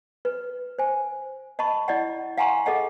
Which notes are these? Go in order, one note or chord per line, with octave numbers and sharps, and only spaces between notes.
B4
C5 G#5
D#5 A5 B5 C#6
E4 D5 D#5 F#5
F5 F#5 G#5 A#5 C6 C#6
G#4 A4 D#5 F#5